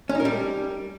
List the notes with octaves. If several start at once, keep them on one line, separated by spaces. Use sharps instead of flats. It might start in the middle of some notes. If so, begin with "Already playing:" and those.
C#4
D#4
A#4
G3